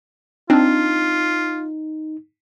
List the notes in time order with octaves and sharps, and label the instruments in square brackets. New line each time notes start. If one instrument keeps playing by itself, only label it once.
[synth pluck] C4 D4 [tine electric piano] D#4 [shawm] F4